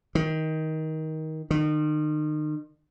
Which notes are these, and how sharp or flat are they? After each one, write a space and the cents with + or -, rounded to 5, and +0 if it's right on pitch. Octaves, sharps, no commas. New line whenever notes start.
D#3 +20
D#3 -35